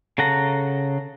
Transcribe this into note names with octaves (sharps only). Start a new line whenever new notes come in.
C#3 A4 F#5 A#5